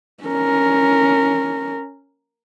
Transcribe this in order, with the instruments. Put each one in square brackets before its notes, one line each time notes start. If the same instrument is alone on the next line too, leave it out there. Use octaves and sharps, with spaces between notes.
[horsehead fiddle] C#4 A#4